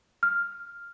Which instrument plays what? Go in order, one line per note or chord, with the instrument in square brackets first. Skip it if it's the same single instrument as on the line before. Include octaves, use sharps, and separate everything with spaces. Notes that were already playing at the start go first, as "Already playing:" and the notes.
[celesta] F6